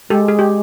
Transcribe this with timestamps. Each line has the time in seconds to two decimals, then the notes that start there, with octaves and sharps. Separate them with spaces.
0.10 G#3 G4 A4
0.28 G#4
0.39 G4